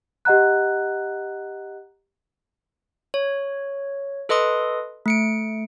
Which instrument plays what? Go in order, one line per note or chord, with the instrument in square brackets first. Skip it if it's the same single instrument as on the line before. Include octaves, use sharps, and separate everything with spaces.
[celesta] G4 D#5 F#5 A#5 F#6
[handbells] C#5
A4 B4 D#5 C6 D#6
A3 C#7 D7